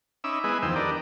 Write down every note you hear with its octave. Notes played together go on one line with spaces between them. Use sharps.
C#4 D#4 E5 B5 D6 E6
G#3 B3 E4 G#4 B4 D#5
E2 D#3 F3 C5 G5 E6
D4 G4 A#4 B4 D5 D#5